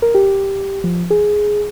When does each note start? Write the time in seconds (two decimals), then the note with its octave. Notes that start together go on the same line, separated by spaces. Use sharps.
0.02 A#4
0.15 G4
0.84 F3
1.10 G#4